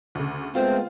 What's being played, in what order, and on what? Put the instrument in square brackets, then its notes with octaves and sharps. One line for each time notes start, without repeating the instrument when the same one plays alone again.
[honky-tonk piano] D2 C#3
[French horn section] G#3 A3 B3 [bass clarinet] C4 [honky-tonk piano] F4 [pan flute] C5